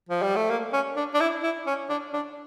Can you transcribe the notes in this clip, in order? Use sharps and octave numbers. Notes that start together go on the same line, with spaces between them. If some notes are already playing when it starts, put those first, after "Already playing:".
F3
G3
A3
A#3
C#4
D4
D4
E4
E4
C#4
D4
D4